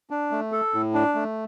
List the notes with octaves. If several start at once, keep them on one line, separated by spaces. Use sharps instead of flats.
D4
A3
A4
A2
D4
A3